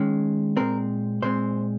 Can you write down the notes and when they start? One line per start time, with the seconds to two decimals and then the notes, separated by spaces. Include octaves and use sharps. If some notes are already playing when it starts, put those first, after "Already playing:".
Already playing: D#3 G#3 C#4
0.57 A#2 G#3 C4 A#4
1.22 A#2 G#3 C4 C5